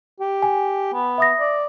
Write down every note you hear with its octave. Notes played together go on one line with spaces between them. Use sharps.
G4
G#5
B3
E5 D#6 A#6
D5